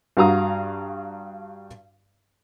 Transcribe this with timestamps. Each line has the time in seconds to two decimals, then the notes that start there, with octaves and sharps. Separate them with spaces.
0.17 G2 F#4 F5 A#5 D#6